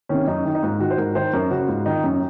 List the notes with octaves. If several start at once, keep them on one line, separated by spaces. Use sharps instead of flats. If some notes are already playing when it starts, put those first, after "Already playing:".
C3 D#3 C#4
F#2 D#4
D#3
D#4
G#2 F4
D#3 F#4
C5
G#2 A#4
D#3 C5
F#2 A#4
C#3 F#4
G#2 F4
D#3 D#4
F#2 C#4